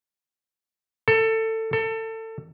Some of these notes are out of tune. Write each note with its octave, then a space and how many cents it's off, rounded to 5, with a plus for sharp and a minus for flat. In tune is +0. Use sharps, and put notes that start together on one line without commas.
A4 +20
A4 +25